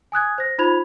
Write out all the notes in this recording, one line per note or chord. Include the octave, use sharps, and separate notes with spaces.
G#5 D#6 F#6 G#6
C5 A#6
D#4 F4 C5 B5 G#6 F7